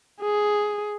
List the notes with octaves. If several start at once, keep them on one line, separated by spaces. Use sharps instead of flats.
G#4